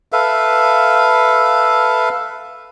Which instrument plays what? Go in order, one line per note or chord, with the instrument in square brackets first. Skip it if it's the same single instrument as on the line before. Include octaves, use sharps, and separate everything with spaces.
[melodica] A4 B4 E5 F5